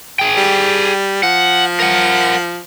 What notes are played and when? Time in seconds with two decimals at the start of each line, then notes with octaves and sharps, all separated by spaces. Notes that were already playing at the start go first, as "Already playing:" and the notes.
0.19 G#4 G5
0.37 G3
1.23 F3 F#5
1.80 A#4 F#5